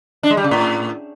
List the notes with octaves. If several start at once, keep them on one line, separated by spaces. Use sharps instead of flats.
D4
G#3
G3
C#3
A2